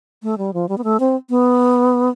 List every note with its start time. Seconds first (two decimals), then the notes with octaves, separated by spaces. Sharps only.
0.23 A3
0.38 G3
0.54 F3
0.69 G3
0.78 B3
0.84 A3
1.00 C4
1.30 B3